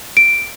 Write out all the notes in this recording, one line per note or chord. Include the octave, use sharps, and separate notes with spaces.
D7